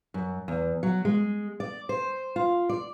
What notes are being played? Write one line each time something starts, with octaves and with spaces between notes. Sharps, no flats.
F#2
E2
F#3
G#3
D5
C5
F4
D5